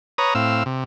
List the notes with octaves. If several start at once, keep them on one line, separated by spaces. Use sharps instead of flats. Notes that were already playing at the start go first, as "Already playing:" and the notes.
B4 C#5 A#5 D#6
A2 C4 F5 E6
C3